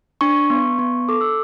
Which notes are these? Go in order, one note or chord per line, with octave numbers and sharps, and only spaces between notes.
D4 C#6
B3
B3
A4 D6
E6